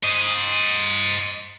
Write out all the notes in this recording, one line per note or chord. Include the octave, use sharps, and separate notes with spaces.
C5 D#5